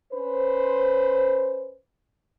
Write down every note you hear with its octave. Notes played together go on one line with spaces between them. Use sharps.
C#4 B4 C5